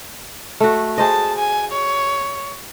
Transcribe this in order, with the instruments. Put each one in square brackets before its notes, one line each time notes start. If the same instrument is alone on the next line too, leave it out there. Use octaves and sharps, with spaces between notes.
[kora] A3 F#4
[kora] G#4 C5 D#5 [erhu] A5
[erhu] G#5
C#5